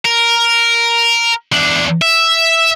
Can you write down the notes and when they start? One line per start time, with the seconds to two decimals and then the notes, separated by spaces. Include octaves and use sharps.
0.05 A#4
1.52 E2 D4
2.02 E5